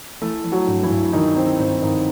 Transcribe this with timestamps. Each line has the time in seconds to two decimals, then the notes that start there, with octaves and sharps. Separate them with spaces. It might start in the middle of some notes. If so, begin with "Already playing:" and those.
0.22 E3 A3 A4
0.44 E3
0.52 F#3 F#4
0.67 G2
0.83 E3 E4
0.90 G2
1.13 D#3 E3 D#4
1.36 E3 C4
1.59 G2 C4
1.82 G2 D#3 D#4